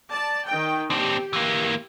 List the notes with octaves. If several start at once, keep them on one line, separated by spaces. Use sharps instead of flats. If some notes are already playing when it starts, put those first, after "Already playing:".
D5 A5
D#3 G5
C4 D4 G4
E3 A#3